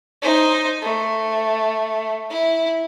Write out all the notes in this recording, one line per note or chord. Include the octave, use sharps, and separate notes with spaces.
D#4 C5
A3
E4